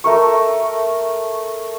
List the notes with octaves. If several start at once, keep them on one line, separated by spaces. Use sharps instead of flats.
A3 A#4 C#6